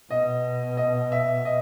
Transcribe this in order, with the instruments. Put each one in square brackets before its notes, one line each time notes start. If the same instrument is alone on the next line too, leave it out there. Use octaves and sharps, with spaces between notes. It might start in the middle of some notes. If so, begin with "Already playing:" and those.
[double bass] B2 [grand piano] D#5
[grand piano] D#5
E5
D#5